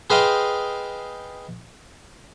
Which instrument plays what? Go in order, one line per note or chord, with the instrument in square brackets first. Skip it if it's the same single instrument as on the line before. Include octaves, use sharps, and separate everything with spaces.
[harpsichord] G#4 B4 C5 D#5 F5 G5